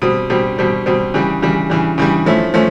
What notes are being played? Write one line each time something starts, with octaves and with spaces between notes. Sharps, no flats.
B2 G3 C4
B2 G3 C4
B2 G3 C4
B2 G3 C4
C#3 E3 G3
C#3 E3 G3
C#3 E3 G3
C#3 E3 G3
F3 A3 C#4 E4
F3 A3 C#4